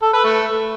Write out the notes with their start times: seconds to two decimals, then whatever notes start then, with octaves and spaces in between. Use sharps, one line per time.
0.02 A4
0.13 B4
0.24 A3